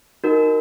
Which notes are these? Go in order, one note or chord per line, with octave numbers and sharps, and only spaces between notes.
D#4 F#4 A#4